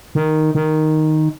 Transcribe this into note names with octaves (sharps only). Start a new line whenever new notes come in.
D#3
D#3